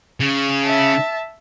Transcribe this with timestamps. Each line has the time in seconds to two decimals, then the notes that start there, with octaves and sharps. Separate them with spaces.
0.20 C#3
0.63 E5 A5